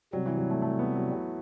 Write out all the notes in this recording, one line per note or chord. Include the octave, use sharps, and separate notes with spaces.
C3 F#3 G3 C4
E3
F#3
A3
A3
B3
F#3